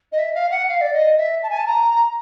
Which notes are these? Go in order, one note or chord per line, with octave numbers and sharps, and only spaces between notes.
D#5
E5
F5
F#5
F5
D5
D#5
E5
A5
G#5
A5
A#5